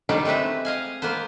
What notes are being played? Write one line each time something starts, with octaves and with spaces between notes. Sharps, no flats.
D3 D#3 F#3 G3 B3 D#4
G#3 A3 C4 B4 E5
D#5 F5 G#5
A#3 B3 B4 C5